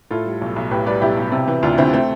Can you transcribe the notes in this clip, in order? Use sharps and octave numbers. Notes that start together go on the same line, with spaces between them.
A2 F4 A4
G3
B1
B1
A2 G4 B4
G3 B4 D5
B1 E4 G4
B1
C3
E3
D2 D4 F4
D2 C4 E4
A3 C4